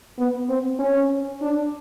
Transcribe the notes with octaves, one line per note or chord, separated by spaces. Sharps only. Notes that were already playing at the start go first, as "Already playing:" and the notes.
B3
C4
C#4
D4